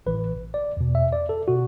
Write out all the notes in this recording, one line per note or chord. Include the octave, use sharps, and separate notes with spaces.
A1 A2 E3 B4
D5
E2 B2
E5
D5
A4
B2 F#4